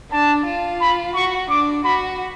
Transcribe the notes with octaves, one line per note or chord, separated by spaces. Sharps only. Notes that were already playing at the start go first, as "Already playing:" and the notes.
D4 A5
F4
B5
F#4 C#6
D4 D6
F#4 B5